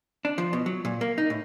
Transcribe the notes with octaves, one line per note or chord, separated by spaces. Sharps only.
D4
F3
B2
F#3
A#2
A#3
D#4
A2